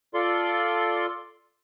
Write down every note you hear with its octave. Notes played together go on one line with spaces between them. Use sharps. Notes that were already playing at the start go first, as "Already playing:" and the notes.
F4 A4 D5 C6